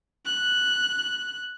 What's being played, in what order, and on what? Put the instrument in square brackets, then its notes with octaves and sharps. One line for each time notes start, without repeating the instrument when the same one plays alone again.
[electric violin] F#6